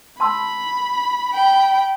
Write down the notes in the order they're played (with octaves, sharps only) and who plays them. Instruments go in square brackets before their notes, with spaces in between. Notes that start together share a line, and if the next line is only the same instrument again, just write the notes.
[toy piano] A5 C6 E6 [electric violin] B5
[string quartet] G5